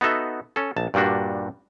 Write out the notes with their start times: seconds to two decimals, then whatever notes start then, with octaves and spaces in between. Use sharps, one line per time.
0.01 B3 D#4 F#4 A4 E5
0.56 C#4 A4
0.76 A#1 A5
0.94 G2 A#2 G3 D4 F#4